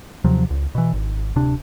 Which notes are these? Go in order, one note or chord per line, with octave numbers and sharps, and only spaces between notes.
D#2 C3 F3 F#3
C#2
B2 E3
G#1
D1 C3 D4